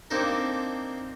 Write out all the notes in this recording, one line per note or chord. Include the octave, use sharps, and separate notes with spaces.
A#3 C4 D4 D#4 A4 A#4